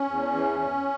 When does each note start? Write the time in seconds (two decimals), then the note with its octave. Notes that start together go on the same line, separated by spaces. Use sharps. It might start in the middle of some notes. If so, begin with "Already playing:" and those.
Already playing: C#4
0.09 E2
0.34 E3